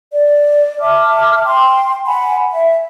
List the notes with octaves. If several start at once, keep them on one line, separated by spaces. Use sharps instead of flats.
D5
E5 A5 D6 F6
G5 C6
F#5 G#5 B5
E5